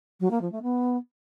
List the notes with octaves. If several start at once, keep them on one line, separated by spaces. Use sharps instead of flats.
F#3
A#3
F3
A3
B3